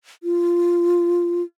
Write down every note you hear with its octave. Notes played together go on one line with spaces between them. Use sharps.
F4